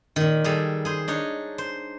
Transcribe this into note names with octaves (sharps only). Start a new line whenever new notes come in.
A#2 D#3
G3 G#4 A4
G#4 C5
D4 D#4 C#5
C5